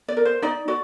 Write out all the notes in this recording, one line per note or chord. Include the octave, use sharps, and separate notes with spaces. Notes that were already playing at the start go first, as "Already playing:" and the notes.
D5
A#4
C5
D#4 D5
F#4 D5